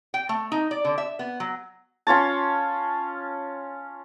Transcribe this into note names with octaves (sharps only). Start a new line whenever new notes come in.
G5
A3
D#4
D5
D3
E5
B3
F#3
C#4 F4 C#5 A5